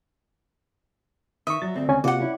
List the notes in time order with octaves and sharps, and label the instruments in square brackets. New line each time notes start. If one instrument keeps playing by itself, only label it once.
[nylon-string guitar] D#3 [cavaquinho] E5 [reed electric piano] C#6 D#6
[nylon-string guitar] F#3 [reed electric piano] A6
[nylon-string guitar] D2 C4
[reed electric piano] C#2 C#4 G#5
[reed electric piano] C3 A#3 F4 [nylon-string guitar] F#4 [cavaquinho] F#5 D6
[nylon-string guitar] C#4 E4